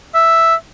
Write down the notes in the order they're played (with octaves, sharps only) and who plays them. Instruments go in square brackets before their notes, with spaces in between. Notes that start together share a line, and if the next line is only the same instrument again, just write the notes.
[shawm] E5